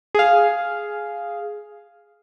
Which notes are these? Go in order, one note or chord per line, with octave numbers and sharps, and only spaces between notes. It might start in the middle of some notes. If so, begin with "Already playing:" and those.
G#4 F5